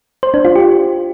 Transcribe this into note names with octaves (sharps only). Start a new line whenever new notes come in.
C5
D4
F4
G4